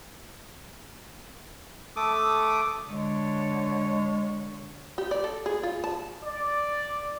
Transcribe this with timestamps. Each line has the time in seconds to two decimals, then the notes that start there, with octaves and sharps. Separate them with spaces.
1.96 A3 A4 D6 D#6
2.89 D3 G#3 C#5
4.98 G4
5.11 D5
5.24 A4
5.46 G#4
5.63 F4
5.84 A5
6.23 D5